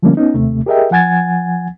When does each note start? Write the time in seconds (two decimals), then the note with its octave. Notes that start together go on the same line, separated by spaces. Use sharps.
0.03 D3 F3 G3 A3 A#3 C#4
0.17 B3 C#4 D#4
0.34 D#2 C3 A3
0.66 G4 G#4 A#4 D#5 E5 G5
0.91 F3 F#5 G#5 G#6 A6